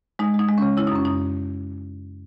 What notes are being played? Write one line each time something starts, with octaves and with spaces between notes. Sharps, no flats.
G#3 D#4
G#3
D#4
G#3
C#3 C#4
C#3 E4
D#4
F#2 C#4
F#2 D#4